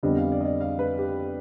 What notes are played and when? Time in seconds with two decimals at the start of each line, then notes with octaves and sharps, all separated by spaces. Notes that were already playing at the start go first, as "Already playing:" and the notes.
0.03 F2 D3 G3 B3 D4 D#5
0.17 F5
0.32 D5
0.41 D#5
0.45 D5
0.61 F5
0.79 B4
0.98 G4